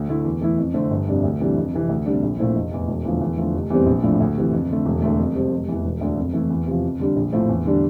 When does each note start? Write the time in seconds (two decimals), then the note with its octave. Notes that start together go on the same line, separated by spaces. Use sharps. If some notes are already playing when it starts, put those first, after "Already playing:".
Already playing: D2
0.09 D3 A3 E4
0.25 E2
0.41 E3 A3 E4
0.58 F2
0.74 D3 A3 C4
0.90 G1
1.08 F2 C3 G3 D4
1.23 D2
1.40 C3 E3 G3 D4
1.57 F2
1.73 C3 E3
1.89 D2
2.06 C3 G3 D4
2.23 A#1
2.39 A#2 A3 C4 E4
2.55 F1
2.71 E2 E3
2.88 E1
3.05 E2 D3 F3 A3
3.21 E2
3.38 D3 F3 A3
3.54 F1
3.70 E2 C3 G3 C4
3.87 A#1
4.03 A2 F3 A3 D4
4.20 D2
4.36 C3 E3
4.52 F2
4.70 D3 A3
4.85 E1
5.02 D2 D3 A3
5.19 F2
5.35 C3 G3 C4
5.51 F1
5.68 E2 E3
5.84 E1
6.01 D2 D3 A3 D4
6.17 F2
6.33 E3 A3 E4
6.50 E2
6.67 C3 F3
6.84 F2
6.99 D3 G3 D4
7.16 A#1
7.33 A2 F3 A3 C4
7.49 E2
7.66 D3 G3 D4